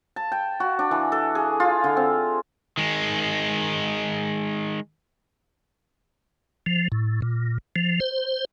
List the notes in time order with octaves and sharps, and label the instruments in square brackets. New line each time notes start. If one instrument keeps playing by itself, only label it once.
[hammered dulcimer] A5
G5
F#4
D4
E3
A4
G#4
F4
D3
C4
[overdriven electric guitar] D#3 G#3
[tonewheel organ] F3
A2
A#2
F3
C5